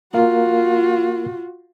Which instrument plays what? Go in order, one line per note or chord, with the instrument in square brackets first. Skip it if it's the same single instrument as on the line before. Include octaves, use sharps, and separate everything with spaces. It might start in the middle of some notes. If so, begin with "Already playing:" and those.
[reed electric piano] A#3 A#4 F5 [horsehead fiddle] F4 F#4